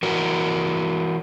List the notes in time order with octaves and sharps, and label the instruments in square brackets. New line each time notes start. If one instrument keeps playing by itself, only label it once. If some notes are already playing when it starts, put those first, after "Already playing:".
[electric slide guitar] E3 F#4 A#4